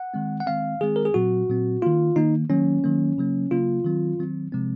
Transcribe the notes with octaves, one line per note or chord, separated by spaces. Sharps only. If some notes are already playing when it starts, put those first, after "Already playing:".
Already playing: F#5
D#3 G#3 C4
F#5
D#3 G#3 C4 F5
D#3 G#3 C4 G#4
A#4
G#4
A#2 F#3 C4 F#4
A#2 F#3 C4
D#3 A#3 F4
D#3 A#3 D#4
D#3 F#3 A#3 C#4
D#3 F#3 A#3
C#3 F#3 A#3
C#3 F#3 A#3 F4
D#3 F#3 C4
D#3 F#3 C4
C3 F3 G#3 C4